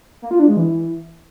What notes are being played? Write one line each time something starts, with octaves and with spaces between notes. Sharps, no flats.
A#3
F4
D4
G#3
E3